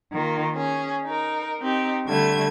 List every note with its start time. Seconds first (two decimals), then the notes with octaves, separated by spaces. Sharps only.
0.12 D#3 A#3 F4
0.56 C#4 G#4
1.03 D#4 A#4
1.61 C4 D#4 G4
2.06 D3 G3 A3 G#6